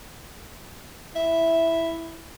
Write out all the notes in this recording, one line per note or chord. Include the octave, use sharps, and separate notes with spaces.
E4 E5